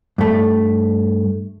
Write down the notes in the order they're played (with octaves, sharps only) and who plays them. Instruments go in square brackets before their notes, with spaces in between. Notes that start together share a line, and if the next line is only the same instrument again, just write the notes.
[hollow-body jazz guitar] G2 A3